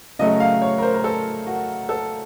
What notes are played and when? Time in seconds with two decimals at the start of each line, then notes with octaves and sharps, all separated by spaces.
0.19 C#3 F#3 A3 D#5
0.40 F5
0.62 C#5
0.78 A#4
0.82 C5
0.94 A#4
1.04 A4
1.47 F#4
1.89 A4